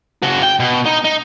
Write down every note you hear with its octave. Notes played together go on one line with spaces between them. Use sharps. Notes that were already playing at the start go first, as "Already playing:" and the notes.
C#3 F#4
G5
B2
D#4
D#4